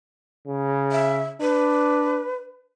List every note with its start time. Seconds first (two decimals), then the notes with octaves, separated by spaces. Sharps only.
0.47 C#3
0.92 E5
1.41 D4 B4